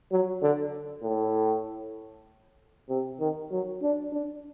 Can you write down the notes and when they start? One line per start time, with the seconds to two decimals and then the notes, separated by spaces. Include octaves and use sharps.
0.11 F#3
0.42 D3
1.03 A2
2.89 C3
3.20 D#3
3.51 F#3
3.82 D4
4.12 D4